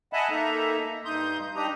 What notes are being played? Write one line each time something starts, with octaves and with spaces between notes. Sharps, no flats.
D#5 E5 F#5 G#5 A5 B5
A#3 D#4 A4 E5 A#5
G2 D#4 C6 D#6 G6
D4 D#4 G4 A#5 D#6